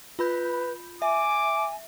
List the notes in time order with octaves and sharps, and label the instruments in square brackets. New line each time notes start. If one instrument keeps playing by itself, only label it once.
[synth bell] F4 B5 G6 [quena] B4
[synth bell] E5 [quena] G#5 [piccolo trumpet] D6